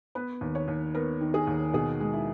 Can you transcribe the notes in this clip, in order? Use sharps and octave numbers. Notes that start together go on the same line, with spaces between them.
B3 B4
D#2
C#5
D#2
B3 A#4
D#3
G#4
D#2
B2 G#4
G#3
E4